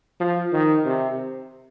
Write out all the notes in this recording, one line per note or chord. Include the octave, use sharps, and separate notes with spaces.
F3
D#3
C3